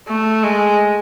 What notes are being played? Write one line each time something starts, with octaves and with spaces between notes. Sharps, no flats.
A3
G#3